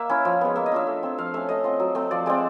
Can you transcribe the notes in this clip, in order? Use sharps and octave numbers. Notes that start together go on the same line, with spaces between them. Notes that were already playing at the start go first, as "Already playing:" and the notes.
Already playing: A#3 E5
C#4 E4
F3
G#3 B3
A#3 E5
D#5
D4 F4 E5
A3
C4 F4
F3 F5
A3 C#4 E5
A3 D#5
C4 F4
F#3
A3 C4
F3 D5
G#3 C4 D5